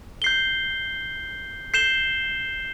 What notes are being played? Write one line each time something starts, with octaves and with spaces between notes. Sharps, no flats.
G6 C7 G7
G6 C7 E7 G7